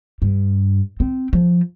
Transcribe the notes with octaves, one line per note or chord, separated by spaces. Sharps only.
G2
C4
F3